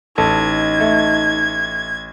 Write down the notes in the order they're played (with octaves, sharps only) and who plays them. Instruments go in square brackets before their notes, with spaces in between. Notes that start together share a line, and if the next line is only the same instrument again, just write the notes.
[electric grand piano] A1 [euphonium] D#4 [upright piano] A4 [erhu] G#6
[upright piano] A3